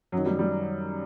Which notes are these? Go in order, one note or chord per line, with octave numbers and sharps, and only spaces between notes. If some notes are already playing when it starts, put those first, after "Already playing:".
F#2 D#3 F#3
G3
G3